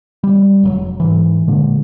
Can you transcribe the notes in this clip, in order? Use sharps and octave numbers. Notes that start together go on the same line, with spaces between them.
G3
F1 G#2 F#3
G#2 E3
A#2 D3 G#3